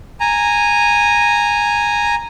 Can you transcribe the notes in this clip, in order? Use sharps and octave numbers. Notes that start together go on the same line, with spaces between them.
G#5 A#5